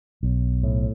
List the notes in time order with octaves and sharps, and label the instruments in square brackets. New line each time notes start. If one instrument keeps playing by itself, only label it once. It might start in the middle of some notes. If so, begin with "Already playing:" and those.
[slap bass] B1
A2